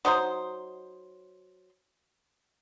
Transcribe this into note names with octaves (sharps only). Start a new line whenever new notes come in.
F#3 D#4 C5 C6